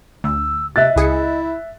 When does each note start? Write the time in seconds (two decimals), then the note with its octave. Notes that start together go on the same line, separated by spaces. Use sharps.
0.24 D2 E6
0.76 C3 D#5 E5 F#6 A6
0.96 C#2 E4 G#4 C#7